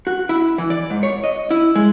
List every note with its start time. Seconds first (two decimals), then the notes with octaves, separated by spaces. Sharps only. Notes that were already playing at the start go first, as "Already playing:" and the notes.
0.07 F#4
0.29 E4
0.58 E3
0.70 D5
0.90 G#2
1.03 C#5
1.24 D#5
1.51 E4
1.75 G#3